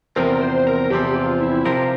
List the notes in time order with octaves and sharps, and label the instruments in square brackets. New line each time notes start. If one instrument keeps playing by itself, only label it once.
[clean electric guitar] E2 C3 F3 C4 [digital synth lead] A#4
[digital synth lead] C5
A#4
[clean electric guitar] E2 C3 F3 C4 [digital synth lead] G4
[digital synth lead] F4
E4
[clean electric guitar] C3 F3 C4 G4 A#4 [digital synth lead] F4